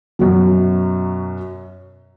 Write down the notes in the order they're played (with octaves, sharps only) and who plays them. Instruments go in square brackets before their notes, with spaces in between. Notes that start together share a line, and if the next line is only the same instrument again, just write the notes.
[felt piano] F#2 B2 F#3